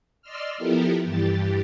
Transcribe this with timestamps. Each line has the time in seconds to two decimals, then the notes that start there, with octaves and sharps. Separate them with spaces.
0.22 D5 D#5 C6 E6 F6
0.58 F3 B3 E4 G4 A4 A#4
1.04 G2 E3 G4 A6